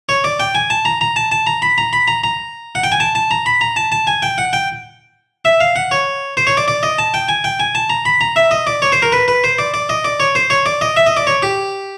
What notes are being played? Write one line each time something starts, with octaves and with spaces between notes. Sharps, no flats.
C#5
D5
G5
G#5
A5
A#5
A#5
A5
A5
A#5
B5
A#5
B5
A#5
A#5
F#5
G5
G#5
A5
A5
A#5
B5
A#5
A5
A5
G#5
G5
F#5
G5
E5
F5
F#5
C#5
C5
C#5
D5
D5
D#5
A5
G5
G#5
G5
G#5
A5
A#5
B5
A#5
E5
D#5
D5
C#5
C5
A#4
B4
B4
C5
D5
D5
D#5
D5
C#5
C5
C#5
D5
D#5
E5
D#5
D5
C#5
G4